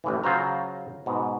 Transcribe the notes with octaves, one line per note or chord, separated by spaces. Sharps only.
A1 A2 E3
C#3 F#3 F4 C5 A#5
G#2 B2